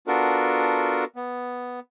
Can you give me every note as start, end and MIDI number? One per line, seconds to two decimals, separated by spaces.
0.08 1.04 59
0.08 1.04 62
0.08 1.04 65
0.08 1.04 66
0.08 1.04 69
0.08 1.04 70
1.16 1.80 59